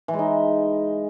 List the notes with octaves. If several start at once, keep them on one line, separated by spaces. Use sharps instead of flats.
E3
G#3
D#4